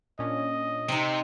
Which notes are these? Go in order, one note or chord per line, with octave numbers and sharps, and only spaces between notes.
A#2 C#4 D4 D#5
C3 C4 D#4